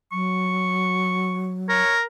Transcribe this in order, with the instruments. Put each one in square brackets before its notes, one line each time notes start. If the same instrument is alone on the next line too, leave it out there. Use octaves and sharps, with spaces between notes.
[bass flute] F#3 [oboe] C#6
[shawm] A#4 [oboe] C#5